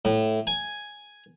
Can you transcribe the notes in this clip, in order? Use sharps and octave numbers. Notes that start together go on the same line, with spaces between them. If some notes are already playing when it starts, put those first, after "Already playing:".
A2
G#5